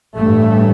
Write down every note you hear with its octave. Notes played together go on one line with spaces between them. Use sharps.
A1 G2 A3